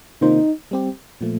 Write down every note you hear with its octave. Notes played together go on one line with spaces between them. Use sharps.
C3 D#3 A#3 D#4 F4 C5
G3 C4 G4
A#2 F3 A3